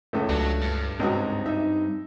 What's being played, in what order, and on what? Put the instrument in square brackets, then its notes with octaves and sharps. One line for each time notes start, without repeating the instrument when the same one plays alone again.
[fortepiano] C#2 A2 [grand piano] A3
[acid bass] C#2 [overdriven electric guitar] F#3 [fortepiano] D4
[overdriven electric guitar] G2
[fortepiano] C#2 D#4 F#4 [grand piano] G#2 [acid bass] C4
[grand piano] D#4 [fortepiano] E5